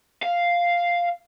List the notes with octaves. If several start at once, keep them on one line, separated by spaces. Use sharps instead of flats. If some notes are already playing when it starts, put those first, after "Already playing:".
F5